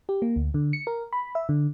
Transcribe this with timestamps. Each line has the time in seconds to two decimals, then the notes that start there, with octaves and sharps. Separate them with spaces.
0.09 G4
0.22 A#3
0.36 D2
0.54 D3
0.73 C#7
0.87 A#4
1.13 B5
1.35 E5
1.49 D3